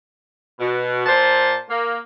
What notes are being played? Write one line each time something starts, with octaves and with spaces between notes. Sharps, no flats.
B2
A#2 C5 A5
A#3